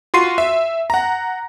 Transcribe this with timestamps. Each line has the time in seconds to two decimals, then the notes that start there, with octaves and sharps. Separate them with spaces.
0.14 F4 F#4 C6 C7 D#7
0.38 E5
0.90 F#5 A#5